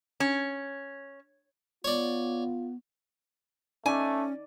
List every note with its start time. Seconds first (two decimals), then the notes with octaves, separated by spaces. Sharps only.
0.20 C#4
1.84 B3 F4 C#5 D5
3.86 A3 C#4 D#4 D5 G#5